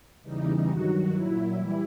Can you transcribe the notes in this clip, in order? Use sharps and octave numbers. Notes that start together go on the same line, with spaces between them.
E2 C#3 E3 G3 D#4
G2 D#3 F#3 F#4
A#2 F#3 E4
E3 G3